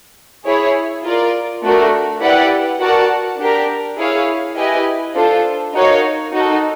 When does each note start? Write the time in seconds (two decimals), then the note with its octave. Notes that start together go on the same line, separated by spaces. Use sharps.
0.46 E4 G#4 C#5
1.04 F4 A#4 D5
1.63 A3 D4 F#4 A#4
2.22 E4 G4 B4 D5 F#5
2.80 F#4 A#4 D5 F#5 A5
3.39 D4 G4 A#4
3.98 E4 G#4 C#5 F5
4.56 E4 G4 B4 D#5 G#5
5.15 D4 F4 A4 C5
5.74 D#4 F#4 A#4 C#5 F5
6.33 D#4 F#4 A4